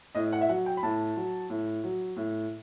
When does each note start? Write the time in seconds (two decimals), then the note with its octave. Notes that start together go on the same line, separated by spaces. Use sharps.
0.15 A2 D#5
0.32 F#5
0.41 E5
0.49 F#3 F#5
0.66 G5
0.77 B5
0.83 A2 A5
1.17 F#3
1.50 A2
1.84 F#3
2.17 A2